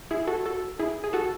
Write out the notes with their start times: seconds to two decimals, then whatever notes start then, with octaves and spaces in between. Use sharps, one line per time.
0.11 E4 G#4
0.27 F#4 A4
0.46 F#4 A4
0.79 E4 G#4
1.04 G#4
1.13 F#4 A4